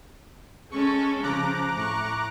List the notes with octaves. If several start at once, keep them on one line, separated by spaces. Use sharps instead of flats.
G#3 C#4 A4 C#6
C#3 F3 A#5 D6 F#6
A2 C#6